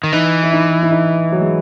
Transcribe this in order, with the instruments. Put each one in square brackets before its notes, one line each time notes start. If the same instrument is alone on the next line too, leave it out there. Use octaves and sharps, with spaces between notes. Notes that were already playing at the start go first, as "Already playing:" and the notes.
[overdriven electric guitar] D#3
[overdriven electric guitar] E3 [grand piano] D#4
[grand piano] E4
D#4
E4
D#4
F#3
G#3